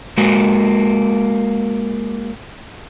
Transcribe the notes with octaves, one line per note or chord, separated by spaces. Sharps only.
G#3 A#3 F#4